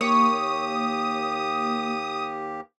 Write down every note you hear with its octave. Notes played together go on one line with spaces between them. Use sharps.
D#2 A#3 G4 C#5 D#6